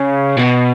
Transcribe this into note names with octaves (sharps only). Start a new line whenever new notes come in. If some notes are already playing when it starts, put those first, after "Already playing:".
Already playing: C#3
B2